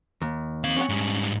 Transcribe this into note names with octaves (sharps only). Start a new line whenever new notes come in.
D#2
C4 F5
C#4 C#5 F#5
G#2 G3